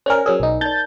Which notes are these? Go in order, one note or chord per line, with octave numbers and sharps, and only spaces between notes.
C#4 A#4 C5 D5 G#5
F#3 C#4 G#4 A#4
B1 D#4
D#4 D5 G6 A6